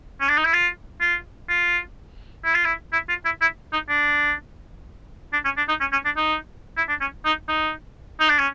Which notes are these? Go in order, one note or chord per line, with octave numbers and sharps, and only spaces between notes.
C#4
D4
D#4
E4
F4
F4
F4
E4
F4
E4
E4
F4
E4
E4
D#4
D4
D4
C#4
D4
D#4
C#4
C#4
D4
D#4
E4
D4
C#4
D#4
D#4
D#4
D4
C#4